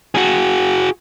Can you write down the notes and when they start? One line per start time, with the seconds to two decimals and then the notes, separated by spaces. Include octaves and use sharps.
0.15 F#4 G#4